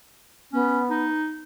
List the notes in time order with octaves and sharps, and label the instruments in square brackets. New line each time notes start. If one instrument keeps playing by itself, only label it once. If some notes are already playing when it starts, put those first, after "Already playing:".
[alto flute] B3 [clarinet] C#4
[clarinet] D#4